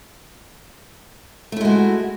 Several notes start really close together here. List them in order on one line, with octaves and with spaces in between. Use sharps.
A3 E4 G#3 F#4